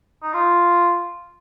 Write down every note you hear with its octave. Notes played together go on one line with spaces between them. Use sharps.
D#4
F4